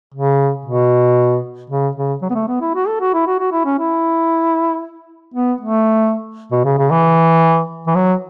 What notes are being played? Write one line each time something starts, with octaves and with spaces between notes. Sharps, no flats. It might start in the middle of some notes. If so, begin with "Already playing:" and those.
C#3
B2
C#3
C#3
F#3
B3
A3
B3
E4
F#4
A4
F#4
E4
F#4
F#4
E4
C#4
E4
B3
A3
B2
C#3
C#3
E3
E3
F#3